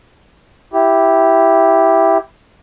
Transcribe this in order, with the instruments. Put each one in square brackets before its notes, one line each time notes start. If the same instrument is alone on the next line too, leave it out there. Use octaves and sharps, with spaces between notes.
[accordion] E4 G4